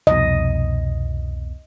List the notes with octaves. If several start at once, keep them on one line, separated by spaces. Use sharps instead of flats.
C2 F2 B2 D#5